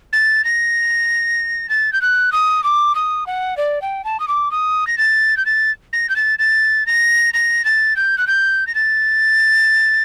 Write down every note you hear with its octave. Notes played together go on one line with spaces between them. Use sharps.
A6
A#6
A6
G6
F#6
D#6
D6
D#6
F#5
D5
G5
A5
D#6
D6
D#6
A#6
A6
G6
A6
A#6
G6
A6
A6
A#6
A#6
A6
G6
F#6
G6
A#6
A6